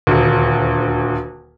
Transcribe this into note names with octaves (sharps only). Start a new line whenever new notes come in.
D#1 D2